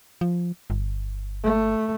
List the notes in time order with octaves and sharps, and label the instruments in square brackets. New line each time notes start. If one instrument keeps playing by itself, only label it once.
[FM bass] F3
G1
[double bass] A3